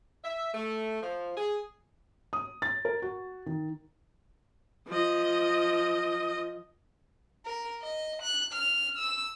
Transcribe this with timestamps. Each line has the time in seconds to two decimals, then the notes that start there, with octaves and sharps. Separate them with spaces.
0.24 E5
0.54 A3
1.02 F3
1.37 G#4
2.33 D#6
2.62 A6
2.85 A#4
3.02 F#4
3.46 D#3
4.88 F3 D#5
7.46 A#4
7.82 D#5
8.22 F#6
8.53 F6
8.98 E6